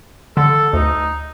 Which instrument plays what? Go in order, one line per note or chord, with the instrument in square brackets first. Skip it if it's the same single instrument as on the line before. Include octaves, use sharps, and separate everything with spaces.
[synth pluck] D3 [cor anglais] A4
[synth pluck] D2 [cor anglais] D#4